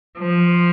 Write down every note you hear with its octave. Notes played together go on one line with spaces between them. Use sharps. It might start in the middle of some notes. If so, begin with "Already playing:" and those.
F3